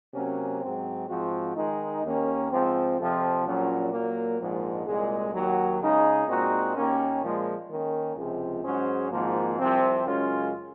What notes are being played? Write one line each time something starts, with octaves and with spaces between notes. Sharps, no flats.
C3 F#3 A#3 C#4
G#2 F#3 C4
G#2 F3 C4 F#4
D#3 G#3 D#4
D#2 D#3 A#3 C#4
G#2 F3 C4
F2 C3 F3
A#1 A#2 F#3 C#4
A#2 F#3 A#3
A#1 G#2 F3 G#3
C2 A#2 G#3
D#2 D#3 F#3
C#3 G#3 D#4 G#4
A#2 G#3 C4 D#4 F#4
D#2 D#3 A#3 C#4
A#2 F3 G#3
D#3 A#3 C#4
C#2 C3 F3 G#3
G#2 F#3 C#4 G#4 C5
G#1 G#2 F3 A#3
C2 C3 F3 C4
F#2 C#3 G#3 C#4 F4